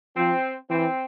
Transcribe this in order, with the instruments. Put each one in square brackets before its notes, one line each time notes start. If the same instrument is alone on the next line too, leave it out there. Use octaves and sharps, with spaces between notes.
[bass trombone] F3 [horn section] C4
[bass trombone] E3 [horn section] C4